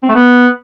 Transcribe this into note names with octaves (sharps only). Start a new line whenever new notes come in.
C4
A3
B3